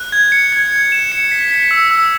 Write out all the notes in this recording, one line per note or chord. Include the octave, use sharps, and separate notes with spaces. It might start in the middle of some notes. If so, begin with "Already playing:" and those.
Already playing: F#6
G#6
C#7
G#6
G#6
E7
C#7
B6
B6
E6
E6